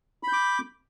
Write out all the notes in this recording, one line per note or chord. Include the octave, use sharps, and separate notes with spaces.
B5 D6 G6